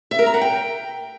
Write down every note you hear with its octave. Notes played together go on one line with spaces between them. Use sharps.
E5
A#4
A#5
F#5
G5